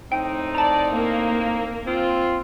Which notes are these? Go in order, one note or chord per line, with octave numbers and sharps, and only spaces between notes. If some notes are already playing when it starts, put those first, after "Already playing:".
A2 C4 D#4 G5
D5 A5 A#5
A#3
C4 F4